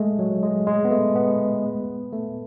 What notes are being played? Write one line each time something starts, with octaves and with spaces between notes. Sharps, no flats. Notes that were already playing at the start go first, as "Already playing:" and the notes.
Already playing: G#3 A3
F#3
G#3
G#3
B3
A3
B3
A3